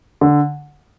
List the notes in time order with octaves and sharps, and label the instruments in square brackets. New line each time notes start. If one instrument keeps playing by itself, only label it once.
[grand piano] D3